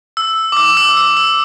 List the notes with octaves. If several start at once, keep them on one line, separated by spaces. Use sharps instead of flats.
E6
D6
E6
E6
E6
E6